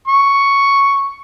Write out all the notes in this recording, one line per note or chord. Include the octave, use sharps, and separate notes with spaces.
C#6